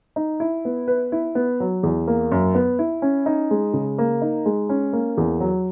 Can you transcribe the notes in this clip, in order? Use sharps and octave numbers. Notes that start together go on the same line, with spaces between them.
D#4
E4
B3
B4
E4
B3
F#3
E2
A#3
F#2
B3
E4
C#4
D#4
G#3
C#3
A#3
D#4
G#3
C#4
A#3
E2
F#3